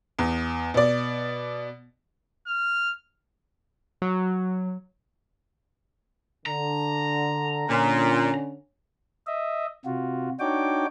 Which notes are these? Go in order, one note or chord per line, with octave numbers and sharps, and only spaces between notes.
E2
B2 D5
F6
F#3
D3 A#5
A#2 D3 C#4
D#5 E5
C3 F4 F#4
D4 D#4 F#4 C#5 G5 D6